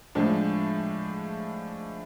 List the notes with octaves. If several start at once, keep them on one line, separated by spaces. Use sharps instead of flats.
A2 F3 G#3 D4